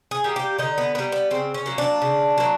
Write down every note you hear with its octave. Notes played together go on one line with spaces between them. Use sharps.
G#4
G3 A#3
G4
D3 D#4
B3
G3 A#3 B3
B3
C#3 C4
C#4
F#3 A#3
D4
C#3
F#3 A#3